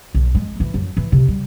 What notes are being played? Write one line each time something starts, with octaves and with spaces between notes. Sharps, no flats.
B1
G#3
E3
F#2
E3
C3
G3